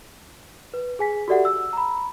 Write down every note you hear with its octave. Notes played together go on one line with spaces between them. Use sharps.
B4
G#4 G#5 B6
F#4 G4 A4 D5 E5 F#5
E6
A#5 B5